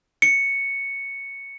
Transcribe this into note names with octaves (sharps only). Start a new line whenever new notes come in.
C#7